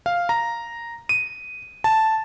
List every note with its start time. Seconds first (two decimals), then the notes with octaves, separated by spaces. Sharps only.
0.06 F5
0.29 A#5
1.09 D#7
1.84 A5